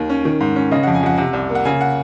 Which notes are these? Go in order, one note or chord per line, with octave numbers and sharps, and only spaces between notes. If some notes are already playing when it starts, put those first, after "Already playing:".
Already playing: D#2 D#3
C#4
D#3
G#2
C#4
C#3 D#5
F2 F#5
G#5
F2 F#5
C3 F#5
C2
A#3
F#5
C#3 G#5
F#5